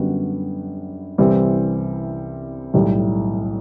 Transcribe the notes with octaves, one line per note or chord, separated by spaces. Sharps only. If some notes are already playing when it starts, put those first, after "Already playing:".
Already playing: F#2 D3 G3 B3 F#4
C2 C3 E3 G3 C4
B1 A2 G3